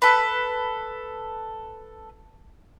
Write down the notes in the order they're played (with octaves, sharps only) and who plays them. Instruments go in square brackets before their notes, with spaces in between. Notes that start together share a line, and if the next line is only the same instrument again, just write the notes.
[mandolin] A4 B4